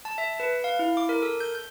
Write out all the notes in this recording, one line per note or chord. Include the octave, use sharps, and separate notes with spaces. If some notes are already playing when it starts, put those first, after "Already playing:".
A5
E5
B4
F5
E4
D6
A#4
A4
G6
G6